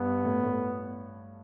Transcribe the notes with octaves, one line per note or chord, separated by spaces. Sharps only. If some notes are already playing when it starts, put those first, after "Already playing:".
Already playing: G2 B3
A2
A2